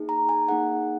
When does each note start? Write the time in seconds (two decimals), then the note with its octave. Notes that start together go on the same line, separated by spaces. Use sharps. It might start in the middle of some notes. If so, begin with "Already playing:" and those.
Already playing: A#3 D#4 G#4
0.09 A#5
0.29 G#5
0.49 A#3 D#4 G#4 F#5